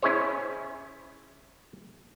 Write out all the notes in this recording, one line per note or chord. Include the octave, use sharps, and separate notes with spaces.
C#4 E4 G#4 C5 C#5